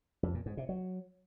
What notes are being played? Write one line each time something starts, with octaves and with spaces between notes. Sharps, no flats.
F2
A#2
G#2
C3
F#3